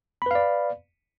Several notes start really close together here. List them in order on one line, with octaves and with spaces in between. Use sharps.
B5 B4 F5 D5